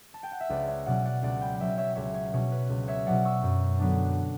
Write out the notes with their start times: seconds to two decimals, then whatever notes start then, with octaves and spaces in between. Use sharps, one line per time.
0.14 A5
0.23 G5
0.32 F#5
0.40 E5
0.49 C#2 B4 D5
0.67 C#5 E5
0.86 B2 F#3 C#4 D5 F#5
1.05 D5 F#5
1.23 C#2 D5 F#5
1.41 G5 B5
1.60 B2 F#3 C#4 E5 G5
1.78 C#5 E5
1.96 C#2 C#5 E5
2.14 C#5
2.33 B2 F#3 C#4 C#5
2.52 B4
2.69 C#2
2.88 C#5 E5
3.06 B2 F#3 C#4 D5 F#5
3.25 C#6 E6
3.43 F#2
3.79 D3 F#3 B3 D4